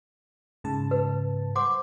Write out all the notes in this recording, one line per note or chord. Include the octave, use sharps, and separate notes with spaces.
G#2 C#3 A5
B4
C5 F#5 C6 D6